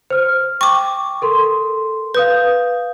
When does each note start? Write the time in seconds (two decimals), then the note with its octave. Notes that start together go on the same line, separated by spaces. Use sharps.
0.10 C5 F6
0.61 G5 C#6 D6
1.22 A4 A#4 C6
2.14 B4 F5 D#6 G6